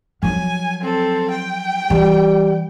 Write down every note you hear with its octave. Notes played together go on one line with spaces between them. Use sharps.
F3 F#3 G#5
C4 A4
G5
E3 G3